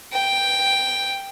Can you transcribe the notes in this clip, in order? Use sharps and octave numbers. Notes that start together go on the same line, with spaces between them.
G5